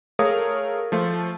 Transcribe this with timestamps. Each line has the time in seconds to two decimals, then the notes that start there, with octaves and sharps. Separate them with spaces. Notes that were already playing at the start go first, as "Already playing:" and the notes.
0.19 A3 G#4 A#4 C#5 F5 D#6
0.92 F3 A3 F4